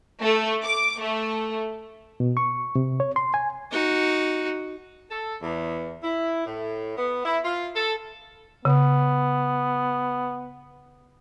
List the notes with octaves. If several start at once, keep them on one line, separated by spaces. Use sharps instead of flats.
A3
D6
A3
B2
C#6
C3
C#5
C6
G#5
D#4 F#4
A4
E2
E4
A2
B3
E4
F4
A4
C#3 B3